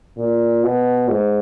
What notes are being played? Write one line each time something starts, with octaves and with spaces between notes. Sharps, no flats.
A#2
B2
G#2